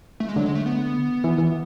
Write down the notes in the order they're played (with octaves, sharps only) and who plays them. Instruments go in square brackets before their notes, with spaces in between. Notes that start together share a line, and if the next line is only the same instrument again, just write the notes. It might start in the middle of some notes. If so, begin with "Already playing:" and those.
[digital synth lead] A3
G#3
[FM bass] D3 [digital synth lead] F#3
[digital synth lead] G#3
A3
B3
[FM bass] E3
E3